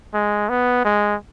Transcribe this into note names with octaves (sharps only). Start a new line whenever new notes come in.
G#3
B3
G#3